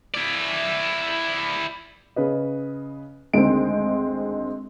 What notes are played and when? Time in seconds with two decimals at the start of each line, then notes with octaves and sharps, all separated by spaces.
0.14 E4 D5
2.16 C#3 B4 D#5
3.34 D2 D#3 G#3 C4 D7